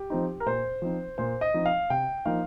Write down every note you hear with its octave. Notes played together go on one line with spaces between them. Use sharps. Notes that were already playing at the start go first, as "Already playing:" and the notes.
Already playing: G4
F3 C4 D#4
A#4
A#2 C5
F3 C4 D#4
A#2 C5
D#5
F3 C4 D#4
F5
C3 G5
F3 A#3 D#4 F5